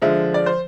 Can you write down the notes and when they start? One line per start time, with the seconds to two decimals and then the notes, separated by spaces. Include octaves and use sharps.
0.02 D3 F3 G#3 E5
0.34 D5
0.46 C5